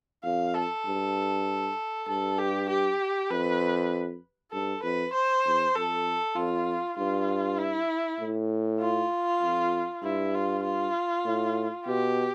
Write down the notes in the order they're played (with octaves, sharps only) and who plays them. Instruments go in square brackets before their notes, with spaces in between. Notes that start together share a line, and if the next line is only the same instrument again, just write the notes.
[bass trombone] F2 [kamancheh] F5
[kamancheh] A4
[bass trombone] G2
[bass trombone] G2 [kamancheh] A4
[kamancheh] G4
G4
[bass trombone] F2 [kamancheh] B4
[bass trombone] G2 [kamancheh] A4
[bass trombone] F2 [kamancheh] B4
[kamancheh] C5
[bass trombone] E2
[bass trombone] F2 [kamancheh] A4
[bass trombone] F2 [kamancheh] F4
[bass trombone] G2 [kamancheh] F4
[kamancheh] E4
[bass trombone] A2
[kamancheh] F4
[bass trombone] F2
[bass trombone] G2 [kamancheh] E4
[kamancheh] F4
F4
[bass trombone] A2
[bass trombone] B2 [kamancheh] G4